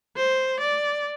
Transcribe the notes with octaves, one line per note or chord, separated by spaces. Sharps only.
C5
D5